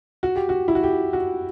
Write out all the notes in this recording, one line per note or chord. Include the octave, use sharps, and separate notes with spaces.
F#4
G4
F#4
E4
F#4
G4
F#4